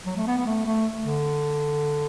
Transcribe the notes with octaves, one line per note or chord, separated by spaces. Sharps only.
F#3
A3
B3
B3
A3
A3
D3